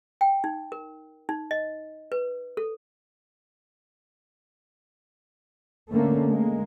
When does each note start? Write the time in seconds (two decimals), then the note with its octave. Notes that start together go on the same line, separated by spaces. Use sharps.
0.21 G5
0.44 D#4
0.72 A#4
1.29 D#4
1.51 D#5
2.12 B4
2.57 A4
5.92 D3 A3 A#3 C#4
6.30 G#3 A#3